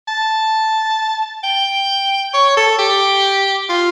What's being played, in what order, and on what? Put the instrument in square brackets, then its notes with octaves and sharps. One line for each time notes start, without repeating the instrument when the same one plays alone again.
[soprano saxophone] A5
G5
C#5
A4
G4
F4